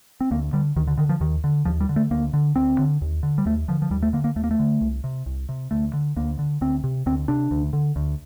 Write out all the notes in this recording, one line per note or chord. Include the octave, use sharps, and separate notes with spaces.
C4
D2 A#3
D3 G3
D2 D#3
D3
D3 D#3
F3
D#2 D#3
D3
D#2 F3
G3
D3
A3
D2 A#3
D3
D2 C4
D3
D#2
D3
G3
D#2 A3
D3 F3
F3
D#2 G3
A3
D3 A#3
A#3
D#2 A3
A#3
A3
D3
C2
C3
C2
C3
D2 A3
D3
D2 A#3
D3
D2 C4
C3
D2 C4
C3 D4
D2
D3
D2